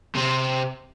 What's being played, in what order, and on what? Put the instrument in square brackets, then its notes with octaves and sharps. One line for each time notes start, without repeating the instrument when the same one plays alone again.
[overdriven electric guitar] C3 C4